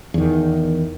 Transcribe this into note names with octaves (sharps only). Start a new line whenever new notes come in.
E2 D#3